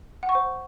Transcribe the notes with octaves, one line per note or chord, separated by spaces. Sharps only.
F#5
C#6
C5